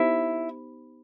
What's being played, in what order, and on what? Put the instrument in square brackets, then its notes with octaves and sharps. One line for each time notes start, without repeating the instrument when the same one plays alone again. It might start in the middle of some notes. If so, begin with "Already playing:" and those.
Already playing: [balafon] B3 D#4 G4 C5 [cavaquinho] E4